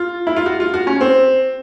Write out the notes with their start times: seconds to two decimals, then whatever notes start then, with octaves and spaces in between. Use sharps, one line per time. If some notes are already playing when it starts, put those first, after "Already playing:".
Already playing: F4
0.27 E4
0.36 F4
0.46 F#4
0.60 F4
0.74 F#4
0.87 C#4
1.01 C4